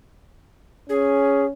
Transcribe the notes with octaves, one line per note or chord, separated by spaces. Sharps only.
C#4 G#4